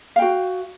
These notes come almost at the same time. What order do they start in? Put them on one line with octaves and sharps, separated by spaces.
F5 G5 F#4